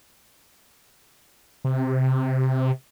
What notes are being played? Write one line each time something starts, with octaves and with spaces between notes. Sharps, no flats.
C3